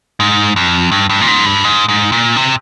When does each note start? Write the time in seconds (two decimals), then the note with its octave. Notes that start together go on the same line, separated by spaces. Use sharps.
0.20 G#2
0.56 F2
0.92 G2
1.09 G2
1.21 A#2
1.28 G#2
1.46 G2
1.64 G#2
1.89 G#2
2.12 A#2
2.36 C3